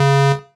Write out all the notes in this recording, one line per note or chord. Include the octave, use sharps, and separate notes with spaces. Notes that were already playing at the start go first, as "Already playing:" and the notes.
Already playing: C#3